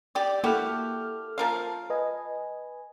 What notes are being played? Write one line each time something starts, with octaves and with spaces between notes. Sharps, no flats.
G4 D5
A#3 E4 F#4 G4 A4 F6
F3 A#4 F5
B4 D#5 G#5